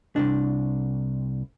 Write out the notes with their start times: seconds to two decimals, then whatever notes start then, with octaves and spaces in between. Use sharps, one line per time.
0.16 C2 G#2 D4